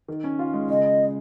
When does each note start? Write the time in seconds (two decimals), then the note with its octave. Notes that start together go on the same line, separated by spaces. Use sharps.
0.08 D#3
0.24 C#4
0.39 F4
0.54 G#3
0.69 C#3 D#5